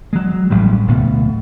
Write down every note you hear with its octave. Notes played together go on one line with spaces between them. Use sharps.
F#3 G#3
A1 A2 G3
D1 B2 A3